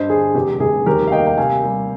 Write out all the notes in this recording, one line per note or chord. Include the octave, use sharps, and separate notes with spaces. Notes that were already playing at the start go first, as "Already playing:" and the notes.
Already playing: G2 C5 D#5
D3 G#4
F1 G4
F1 G#4
D#2 G4 A#4
F5
A#3 D#5 G5
G5
C3 F5 G#5
G3